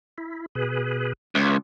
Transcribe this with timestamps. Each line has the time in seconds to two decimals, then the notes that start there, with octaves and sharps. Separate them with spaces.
0.18 E4
0.55 B2 G#4 B4
1.35 C#2 B4 C#5 E5